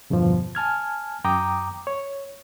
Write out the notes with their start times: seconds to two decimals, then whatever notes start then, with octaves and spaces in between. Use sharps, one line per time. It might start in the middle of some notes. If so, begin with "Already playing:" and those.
0.10 E2 G2 B2 D3 F3
0.55 G#5 A5 F6 G#6
1.24 F#2 G5 A#5 D6 D#6
1.87 C#5